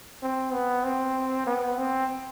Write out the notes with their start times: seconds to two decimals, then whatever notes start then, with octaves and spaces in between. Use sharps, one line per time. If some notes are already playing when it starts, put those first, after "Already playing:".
0.23 C4
0.53 B3
0.85 C4
1.47 B3
1.78 C4